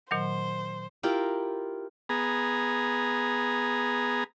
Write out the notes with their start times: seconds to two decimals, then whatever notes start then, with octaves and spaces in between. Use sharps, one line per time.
0.11 A#2 D#3 F#3 C5
1.03 E4 F4 G4 A#4
2.09 B3 G#4 A#5